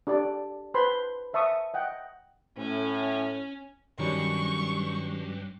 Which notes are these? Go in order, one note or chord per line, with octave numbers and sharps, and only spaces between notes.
D4 G4 G#4 D5
B4 C5 A5 B5 C6
C5 E5 A5 C#6 D#6
D#5 F#5 G5
A2 C#4
G2 D#3 F#3 G3 C#4 C#6